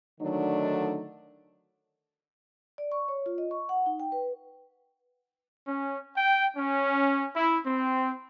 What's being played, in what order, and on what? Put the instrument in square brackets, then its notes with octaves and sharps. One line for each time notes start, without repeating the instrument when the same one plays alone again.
[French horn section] D3 D#3 F#3 A3 D4 D#4
[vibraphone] D5
C#6
C#5
F4
D#5
C#6
F#5
D#4
G5
B4
[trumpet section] C#4
G5
C#4
E4
C4